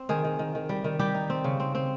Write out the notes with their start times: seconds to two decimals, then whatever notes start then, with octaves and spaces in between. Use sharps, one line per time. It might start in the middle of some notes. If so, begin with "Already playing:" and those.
Already playing: C4
0.09 D#3 G#4
0.24 D#3
0.39 D#3
0.55 D#3
0.69 G3
0.84 D#3
0.99 G3 G4
1.14 D#4
1.30 C4
1.44 C#3
1.60 C4
1.75 C4